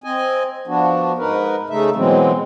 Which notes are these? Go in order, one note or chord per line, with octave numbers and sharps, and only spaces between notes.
C4 D#5 G#5
F3 B3 D4 F#4
G#2 D#4 A#4 B4
C#3 A3 D#4 E5
B2 E3 F#3 G#3 C4